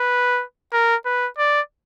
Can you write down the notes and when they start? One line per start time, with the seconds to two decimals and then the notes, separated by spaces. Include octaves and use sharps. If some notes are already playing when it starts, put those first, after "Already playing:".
Already playing: B4
0.73 A#4
1.05 B4
1.38 D5